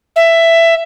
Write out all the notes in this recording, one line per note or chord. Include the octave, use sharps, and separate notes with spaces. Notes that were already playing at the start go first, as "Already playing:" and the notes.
E5